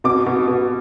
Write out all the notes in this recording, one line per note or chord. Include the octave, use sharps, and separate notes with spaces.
B2 D6
B2
B2